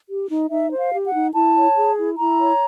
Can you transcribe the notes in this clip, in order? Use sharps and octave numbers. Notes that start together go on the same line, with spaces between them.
G4
D#4
D#4 E5
C5
F5
G4
F#5
D#4
E4 A5
C#5
G#4
E4
E4 A#5
C#5